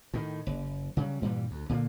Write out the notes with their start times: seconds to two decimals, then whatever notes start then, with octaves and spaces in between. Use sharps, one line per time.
0.14 A2 D#3
0.47 F#1
0.97 C#3 F#3 G3
1.22 G2 A#2 E3 G3
1.51 D2
1.69 A#2 D3 A3 A#3